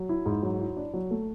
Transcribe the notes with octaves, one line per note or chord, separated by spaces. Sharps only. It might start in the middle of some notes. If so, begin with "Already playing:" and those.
Already playing: F#3
E4
G#2
F#3
E4
D4
F#3
A3